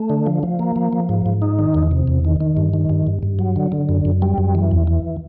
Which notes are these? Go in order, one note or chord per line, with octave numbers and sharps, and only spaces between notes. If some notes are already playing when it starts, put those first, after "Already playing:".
Already playing: A3
D3
F3
F3
A#3
F3
F3
G#2
G#2
D#4
D#3
E2
C3
E2
D#3
D#3
G2
D#3
G2
G2
G2
F#3
D3
D3
F#2
F#2
G3
F#2
E3
E2
E3